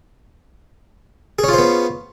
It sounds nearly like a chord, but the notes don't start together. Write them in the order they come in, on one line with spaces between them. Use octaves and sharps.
G#4 C#4 F4 C5 B3